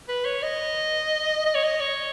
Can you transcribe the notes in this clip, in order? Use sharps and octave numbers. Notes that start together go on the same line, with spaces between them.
B4
C#5
D#5
D#5
C#5
D#5
C#5